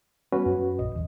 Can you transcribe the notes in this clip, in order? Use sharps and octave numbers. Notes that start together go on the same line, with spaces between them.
G3 A#3 B3 C#4 F#4 B4
F#2
A#1 D#5
F#1 E2